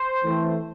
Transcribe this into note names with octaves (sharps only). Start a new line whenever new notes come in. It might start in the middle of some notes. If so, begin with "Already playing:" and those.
Already playing: C5
E3 A3 C4